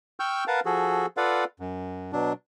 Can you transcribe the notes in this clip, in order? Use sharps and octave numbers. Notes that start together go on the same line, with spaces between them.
G5 C#6 E6 F6 G6
A#4 B4 F5 F#5 A5
F3 F#4 G#4 A4
F4 A4 B4 D5 F5 F#5
F#2
B2 F#3 D4